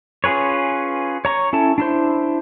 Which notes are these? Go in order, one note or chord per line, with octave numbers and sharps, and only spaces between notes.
C#4 F4 G#4 B4 C#5
C#5 A#5 C#6
C#4 E4 A4 A5
D4 E4 C5